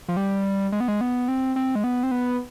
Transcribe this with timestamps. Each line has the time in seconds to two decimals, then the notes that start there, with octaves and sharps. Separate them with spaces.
0.08 F3
0.17 G3
0.72 G#3
0.80 B3
0.88 G#3
1.01 B3
1.28 C4
1.56 C4
1.75 G#3
1.84 B3
2.03 C4
2.11 B3